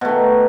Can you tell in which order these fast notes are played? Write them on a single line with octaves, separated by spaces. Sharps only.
B2 A3 D#3